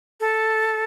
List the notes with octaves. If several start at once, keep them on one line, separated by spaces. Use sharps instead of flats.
A4